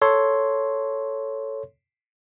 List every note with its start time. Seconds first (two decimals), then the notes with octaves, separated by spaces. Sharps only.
0.02 A4 C#5 C6